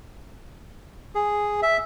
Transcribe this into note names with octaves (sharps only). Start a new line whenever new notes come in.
G#4
E5